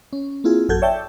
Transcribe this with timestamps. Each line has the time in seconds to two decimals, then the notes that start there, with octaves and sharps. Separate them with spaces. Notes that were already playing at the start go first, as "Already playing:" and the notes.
0.13 C#4
0.44 A#3 C4 E4 F4 G#4
0.69 A1 F#2 F#4 A4 G6 G#6
0.82 C#5 D5 E5 G5 A5 G6